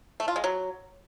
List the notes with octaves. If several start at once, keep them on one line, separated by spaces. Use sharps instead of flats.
A3
F4
G#3
F#3